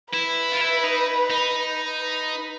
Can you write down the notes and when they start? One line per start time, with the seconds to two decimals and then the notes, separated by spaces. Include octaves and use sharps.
0.14 E4 B4
0.53 F4
0.61 E4
0.84 D#4
1.30 D#4
2.00 B4